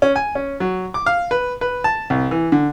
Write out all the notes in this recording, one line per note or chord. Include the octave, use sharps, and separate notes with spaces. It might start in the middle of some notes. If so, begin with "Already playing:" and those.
C#4
G#5
C#4
F#3
D6
F5
B4
B4
A5
C2
E3
D3